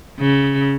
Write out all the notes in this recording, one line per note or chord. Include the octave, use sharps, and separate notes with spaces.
C#3